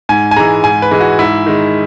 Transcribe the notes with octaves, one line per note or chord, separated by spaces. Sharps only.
G#2 G#5
G#5
E3 G#3 A#5
G#2 G#5
B4
E3 G#3
F#4
G#2 E4
D#3 G#3